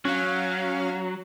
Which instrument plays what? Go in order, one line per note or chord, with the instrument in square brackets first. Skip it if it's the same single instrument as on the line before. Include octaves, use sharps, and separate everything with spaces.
[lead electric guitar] F#3 [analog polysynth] C#4 F5